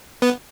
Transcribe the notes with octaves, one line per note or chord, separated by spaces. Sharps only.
B3